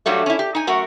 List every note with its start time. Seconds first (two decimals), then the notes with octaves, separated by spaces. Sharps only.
0.06 G2 F#3 G3 A3
0.26 C#4 E4
0.39 G4
0.55 D#4 G#5
0.67 F#2 A3 F#4 A#4